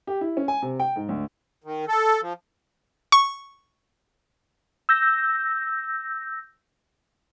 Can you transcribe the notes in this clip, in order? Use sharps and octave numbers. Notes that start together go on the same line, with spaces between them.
G4
E4
C#4
G#5
C3
G5
G#2
D2
D#3
A4
F3
C#6
E6 G6 A#6